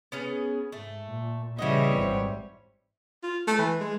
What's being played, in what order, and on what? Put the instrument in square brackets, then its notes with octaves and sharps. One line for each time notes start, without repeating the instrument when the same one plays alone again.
[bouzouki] B3 C#4 G#4
[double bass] G#2 [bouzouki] A3
[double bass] A#2
[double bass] C#3 [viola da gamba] E3 G3 C#5 [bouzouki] E4 F#4 D#5
[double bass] G#1 C4
[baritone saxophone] F4
A3
E3
G#3